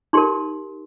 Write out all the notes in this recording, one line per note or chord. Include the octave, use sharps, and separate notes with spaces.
D#4 G4 A#4 C6